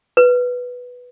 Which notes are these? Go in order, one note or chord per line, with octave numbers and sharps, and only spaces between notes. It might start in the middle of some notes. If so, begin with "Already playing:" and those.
B4